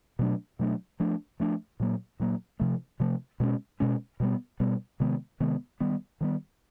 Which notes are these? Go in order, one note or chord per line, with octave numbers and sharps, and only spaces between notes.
B2 F#3 A3 D4
B2 F#3 A3 D4
F3 A3 D4
F3 A3 D4
A#2 F#3 A#3
A#2 F#3 A#3
C3 F3 A3
C3 F3 A3
B2 G#3 C#4
B2 G#3 C#4
B2 G3 B3
B2 G3 B3
C3 D#3 G#3 B3
C3 D#3 G#3 B3
D#3 G3 B3
D#3 G3 B3